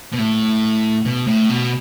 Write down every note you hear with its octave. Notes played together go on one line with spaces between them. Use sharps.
B2
A2
B2
A2
B2